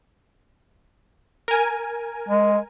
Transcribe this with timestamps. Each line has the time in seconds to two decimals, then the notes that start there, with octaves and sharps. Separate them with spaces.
1.48 A#4 G#5
2.28 G#3